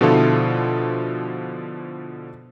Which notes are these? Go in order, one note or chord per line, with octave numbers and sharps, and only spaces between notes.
B2 D3 F3 E4 F4 A4